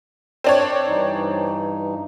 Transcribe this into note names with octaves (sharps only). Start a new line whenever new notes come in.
C4 D4 C#5
G2 E3 D#4